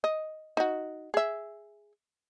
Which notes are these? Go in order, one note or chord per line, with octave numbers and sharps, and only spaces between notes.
D#5
D#4 F#4
G#4 E5